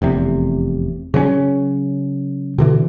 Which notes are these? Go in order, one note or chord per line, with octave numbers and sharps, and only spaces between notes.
F1 E2 C3
C#3 F#3 C4 C#4
B2 D3 E3